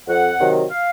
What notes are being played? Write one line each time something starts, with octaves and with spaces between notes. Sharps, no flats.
F2 F#5
C3 D#3 F#3
F5